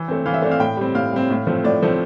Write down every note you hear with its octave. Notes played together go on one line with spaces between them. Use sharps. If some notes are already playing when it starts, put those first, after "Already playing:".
Already playing: E3 E6
A3 C4
E3 F5
E5
A3 C4 D5
F5
A2 G5
G3 C4
A2 F5
G3 C4
A2
F3 A3 C4
A2 D5
F3 A3 C4